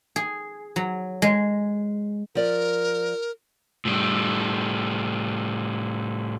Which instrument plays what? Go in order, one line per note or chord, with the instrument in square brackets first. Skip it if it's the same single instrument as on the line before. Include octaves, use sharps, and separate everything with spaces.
[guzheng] G#4
F#3
G#3
[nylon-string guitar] F3 D5 [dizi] A#4
[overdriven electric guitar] A2 G3